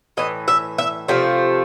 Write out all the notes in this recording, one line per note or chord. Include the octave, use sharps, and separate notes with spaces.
A2 E3 D#5
E5
E5
C3 F3 A3